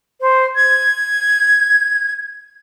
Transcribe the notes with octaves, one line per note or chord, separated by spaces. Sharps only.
C5
G#6